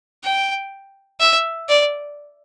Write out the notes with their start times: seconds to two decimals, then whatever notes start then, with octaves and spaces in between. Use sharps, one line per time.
0.24 G5
1.20 E5
1.69 D5